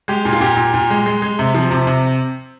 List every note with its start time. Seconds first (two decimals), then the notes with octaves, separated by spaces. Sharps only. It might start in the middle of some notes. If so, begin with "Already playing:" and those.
0.08 G#3 G4
0.25 A#2
0.33 F4
0.41 A#2 G4
0.57 A#2
0.74 A#2
0.90 G#3
1.06 G#3
1.22 G#3
1.39 C3
1.55 F3
1.71 C3
1.87 C3